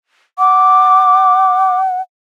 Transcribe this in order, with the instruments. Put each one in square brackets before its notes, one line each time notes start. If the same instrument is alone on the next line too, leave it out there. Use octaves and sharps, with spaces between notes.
[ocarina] F#5 [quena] D6